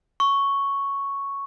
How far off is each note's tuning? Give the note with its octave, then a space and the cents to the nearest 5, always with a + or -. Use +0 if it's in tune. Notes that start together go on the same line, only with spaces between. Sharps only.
C#6 +0